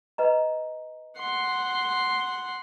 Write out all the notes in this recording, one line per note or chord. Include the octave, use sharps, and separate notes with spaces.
B4 D#5 A#5
F#5 C6